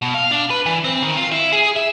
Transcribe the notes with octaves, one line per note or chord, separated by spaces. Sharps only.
B2
F5
D4
B4
E3
C4
D#3
F4
E4
G#4
E5